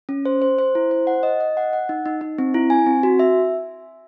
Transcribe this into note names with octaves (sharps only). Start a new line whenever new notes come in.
C#4
C5
C5
C5
E4
C5
F#5
D#5
D#5
F#5
F#5
D#4
D#4
D#4
C4
E4
G#5
C4
F#4
E5